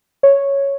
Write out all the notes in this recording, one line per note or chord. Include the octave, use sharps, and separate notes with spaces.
C#5